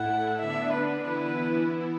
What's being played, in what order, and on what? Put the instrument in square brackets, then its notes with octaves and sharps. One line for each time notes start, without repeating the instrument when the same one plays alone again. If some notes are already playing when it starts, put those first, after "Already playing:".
Already playing: [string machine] A2 A3 E4 [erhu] F#5
[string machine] D3 B3 D4 [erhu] E5
[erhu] B4
[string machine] E3 B3 E4 [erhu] B4